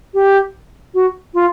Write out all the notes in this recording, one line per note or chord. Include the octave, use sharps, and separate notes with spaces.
G4
F#4
F4